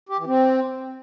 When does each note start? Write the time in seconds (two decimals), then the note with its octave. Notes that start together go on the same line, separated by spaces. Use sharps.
0.09 G4
0.18 E3
0.26 C4